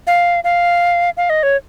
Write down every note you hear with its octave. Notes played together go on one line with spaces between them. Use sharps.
F5
F5
F5
D#5
C#5